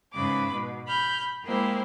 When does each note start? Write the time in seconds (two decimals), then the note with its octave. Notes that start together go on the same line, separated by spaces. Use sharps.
0.13 G#2 C#3 B4 B5 D6
0.53 B2
0.87 B5 F6 G6
1.44 G#3 A#3 E4 G4 C5